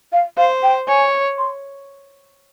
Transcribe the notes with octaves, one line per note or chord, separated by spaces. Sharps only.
F5
C5 F5
G5
C#5 G#5
C6